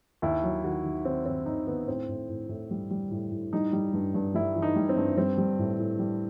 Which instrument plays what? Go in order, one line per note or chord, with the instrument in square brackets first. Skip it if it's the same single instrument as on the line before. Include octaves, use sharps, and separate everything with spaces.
[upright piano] D#2 E4
F#3
D#3 F#4
D#3
D#3 C4
D#2 C4
D#2 D#4
D#3 B3
A2 C4
A2
A2
A2
G3
G3
A2
A2
G3 D#4
G3
G2
G2
G3 E4
E3
D#4
G3
C4
G2
G3 C4
G3
A2
A2
G3